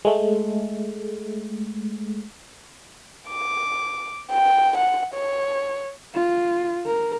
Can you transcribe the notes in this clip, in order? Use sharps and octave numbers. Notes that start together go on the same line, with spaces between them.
G#3 A3
D6
G5
F#5
C#5
F4
A#4